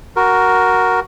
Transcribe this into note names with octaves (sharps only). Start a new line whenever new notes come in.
F#4 A#4